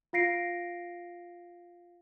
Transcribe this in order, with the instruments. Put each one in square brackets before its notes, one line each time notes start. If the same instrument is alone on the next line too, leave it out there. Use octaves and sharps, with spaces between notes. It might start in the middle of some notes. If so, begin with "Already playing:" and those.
[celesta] F4 F5 A#6 C7 D7